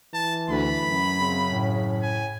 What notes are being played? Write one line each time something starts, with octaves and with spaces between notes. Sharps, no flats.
E3 A5
D2 B5
F#2
C#3 C4
A2
G#5